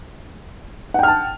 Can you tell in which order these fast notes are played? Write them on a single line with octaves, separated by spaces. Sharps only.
F#5 G5 F6 A5